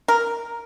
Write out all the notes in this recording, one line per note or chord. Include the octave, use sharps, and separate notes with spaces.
A#4